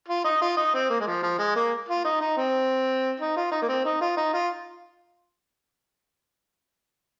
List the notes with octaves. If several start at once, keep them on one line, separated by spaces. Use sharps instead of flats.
F4
D#4
F4
D#4
C4
A#3
G#3
F3
F3
G#3
A#3
F4
D#4
D#4
C4
D#4
F4
D#4
A#3
C4
D#4
F4
D#4
F4